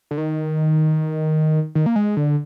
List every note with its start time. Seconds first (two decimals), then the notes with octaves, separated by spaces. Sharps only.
0.11 D3
0.18 D#3
1.75 D#3
1.86 A#3
1.96 G#3
2.17 D3